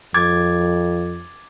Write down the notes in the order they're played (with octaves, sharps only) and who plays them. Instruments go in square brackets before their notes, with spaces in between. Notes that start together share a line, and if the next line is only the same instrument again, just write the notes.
[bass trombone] F2 [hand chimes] D6 G#6 A6